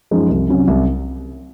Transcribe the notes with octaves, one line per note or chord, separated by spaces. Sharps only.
F#2 F3 G#3 D#4
C2
C3 F#3 C#4
C2